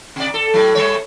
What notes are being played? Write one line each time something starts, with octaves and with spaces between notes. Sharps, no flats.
C3 D5
A4
A2 F#3
G3 A3 C#5